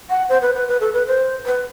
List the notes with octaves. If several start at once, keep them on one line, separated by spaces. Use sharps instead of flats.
F#5
C5
B4
B4
B4
A4
B4
C5
B4